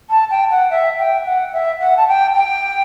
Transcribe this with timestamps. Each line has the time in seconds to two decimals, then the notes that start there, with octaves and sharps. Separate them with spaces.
0.10 A5
0.31 G5
0.51 F#5
0.71 E5
0.98 G5
1.25 F#5
1.53 E5
1.80 F#5
1.97 A5
2.08 G5
2.35 G5